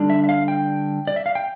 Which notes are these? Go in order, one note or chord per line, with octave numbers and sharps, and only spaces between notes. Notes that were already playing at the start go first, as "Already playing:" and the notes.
Already playing: D3 G3 D4
E5
E5
F5
G5
D5
E5
F5
G5